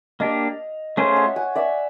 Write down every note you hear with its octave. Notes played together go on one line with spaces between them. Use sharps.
A#3 D4 G4 D#5 F5
A3 C#4 F4 G#4 C5 C#5 D#5
E5 F#5
F#5 G#5
D5 E5